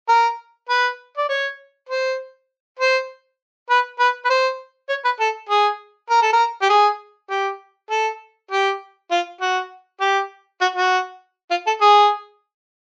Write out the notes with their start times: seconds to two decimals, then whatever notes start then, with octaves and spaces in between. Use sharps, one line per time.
0.09 A#4
0.69 B4
1.17 D5
1.29 C#5
1.89 C5
2.79 C5
3.70 B4
4.00 B4
4.25 B4
4.30 C5
4.89 C#5
5.05 B4
5.20 A4
5.49 G#4
6.10 A#4
6.22 A4
6.33 A#4
6.62 G4
6.70 G#4
7.30 G4
7.90 A4
8.51 G4
9.11 F4
9.41 F#4
10.01 G4
10.61 F#4
10.76 F#4
11.51 F4
11.67 A4
11.81 G#4